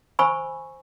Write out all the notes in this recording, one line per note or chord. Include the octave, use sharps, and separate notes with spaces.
C5 G#5 B5 C#6 E6